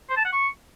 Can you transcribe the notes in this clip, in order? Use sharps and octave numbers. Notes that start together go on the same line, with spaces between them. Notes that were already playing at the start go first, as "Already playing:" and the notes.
C5
A5
F#5
C#6